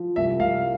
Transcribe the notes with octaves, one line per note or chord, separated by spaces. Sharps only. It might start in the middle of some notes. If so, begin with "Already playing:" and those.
Already playing: F3
C2 E5
C2 F5